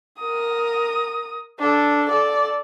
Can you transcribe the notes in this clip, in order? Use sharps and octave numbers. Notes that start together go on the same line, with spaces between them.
A#4 D#6
D4 A4
A4 D5